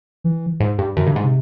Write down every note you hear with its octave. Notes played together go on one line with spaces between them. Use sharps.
E3
G#2
G2
F#2 D#3
G2 D3
G#2
C3